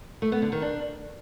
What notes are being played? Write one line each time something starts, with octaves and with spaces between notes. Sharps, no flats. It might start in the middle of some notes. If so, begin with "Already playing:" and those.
A3
B3
D3
D#3
D4